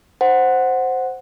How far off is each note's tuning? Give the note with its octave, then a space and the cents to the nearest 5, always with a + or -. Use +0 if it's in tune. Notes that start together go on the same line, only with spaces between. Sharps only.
C5 +0 F#5 +0